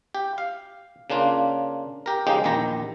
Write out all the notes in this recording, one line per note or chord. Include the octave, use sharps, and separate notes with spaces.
G4
F5
C#3 A#3 D4 F4
G4 A#4
C#3 F3 G#3 D#4 G4
A#1 E2 D#3 G4 A#5